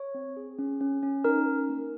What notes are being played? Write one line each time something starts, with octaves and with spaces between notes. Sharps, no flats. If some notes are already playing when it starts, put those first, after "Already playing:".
Already playing: C#5
C4
G#4
C#4
C#4
C#4
D#4 A#4
D#4
A#3